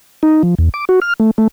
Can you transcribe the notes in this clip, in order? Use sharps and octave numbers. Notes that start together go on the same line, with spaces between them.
D#4
F3
E2
D6
F#4
F6
A3
A3